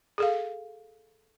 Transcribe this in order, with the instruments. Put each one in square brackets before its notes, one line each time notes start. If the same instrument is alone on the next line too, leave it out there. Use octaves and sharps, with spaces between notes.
[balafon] G#4 A4 F5